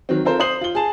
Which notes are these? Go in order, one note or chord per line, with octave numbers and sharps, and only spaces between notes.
D#3 F#3 C4
C4 F4 A4 A#4 C5
C5 D#6 C7 F#7
F4 G7
G#4 A5